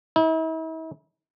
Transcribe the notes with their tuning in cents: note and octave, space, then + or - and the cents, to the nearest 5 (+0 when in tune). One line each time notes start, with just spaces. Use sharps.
E4 -45